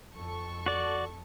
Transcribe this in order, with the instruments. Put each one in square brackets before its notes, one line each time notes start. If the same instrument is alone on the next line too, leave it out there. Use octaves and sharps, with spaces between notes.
[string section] F2 A4 C#6
[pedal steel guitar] F#4 D5